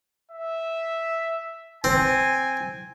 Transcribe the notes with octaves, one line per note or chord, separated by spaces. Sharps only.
E5
C4 G#5